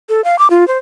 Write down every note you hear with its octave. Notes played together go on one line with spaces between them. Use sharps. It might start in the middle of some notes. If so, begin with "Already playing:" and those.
A4
F5
D6
F4
C5